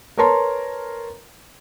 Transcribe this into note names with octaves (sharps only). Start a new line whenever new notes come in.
A#4 B4 C#5 A5 A#5 C6